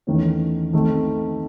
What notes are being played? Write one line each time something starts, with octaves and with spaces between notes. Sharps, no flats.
E2 D#3 A3 C#4
D#3 A3 C4 D#4